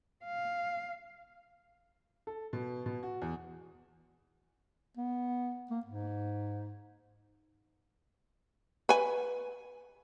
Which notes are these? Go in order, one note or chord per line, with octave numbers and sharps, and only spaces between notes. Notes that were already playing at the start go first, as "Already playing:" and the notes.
F5
A4
B2
B2
F#4
E2
B3
A#3
G#2
B4 G#5